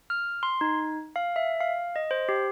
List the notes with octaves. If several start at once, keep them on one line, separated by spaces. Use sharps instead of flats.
F6
C6
D#4
F5
E5
F5
D#5
C5
G4